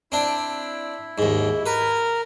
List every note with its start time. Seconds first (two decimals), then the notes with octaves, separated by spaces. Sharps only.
0.12 C4 D4 E4
1.18 D#2 G#2
1.66 A#4 B4